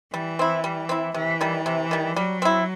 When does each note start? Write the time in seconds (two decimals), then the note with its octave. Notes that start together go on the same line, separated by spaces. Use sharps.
0.13 E3 G3
0.39 C4 E4
0.64 G3
0.89 C4 E4
1.14 C3 E3
1.41 D#3 G3
1.66 C3
1.91 D#3 G3
2.16 F#3 G3
2.42 C4 E4